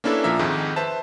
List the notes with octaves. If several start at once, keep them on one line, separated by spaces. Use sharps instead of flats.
A#3 C#4 D4 E4 A4 B4
A#2 F3 A#4 E5 A#5
F2 G#2 D#3 G#3
B4 C5 E5 A5